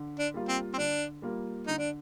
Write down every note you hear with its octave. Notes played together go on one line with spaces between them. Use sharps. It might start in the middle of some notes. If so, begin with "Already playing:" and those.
Already playing: D3
D4
G3 A#3 F4
C4
C4
D3 D4
G3 A#3 F4
D3 D#4
D4